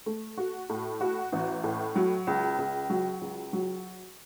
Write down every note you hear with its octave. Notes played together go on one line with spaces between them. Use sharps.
A3
F#4
A2
F#4
A1
A2
F#3
C#2
C#2
F#3
C#2
F#3